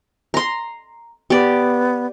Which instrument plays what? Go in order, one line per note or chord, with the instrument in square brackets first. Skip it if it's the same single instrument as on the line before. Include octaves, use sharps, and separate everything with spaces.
[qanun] A#5 C6
[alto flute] B3 [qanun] G4 D5